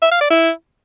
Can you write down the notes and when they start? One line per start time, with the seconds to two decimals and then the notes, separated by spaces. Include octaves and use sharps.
0.02 E5
0.11 F5
0.21 D5
0.30 E4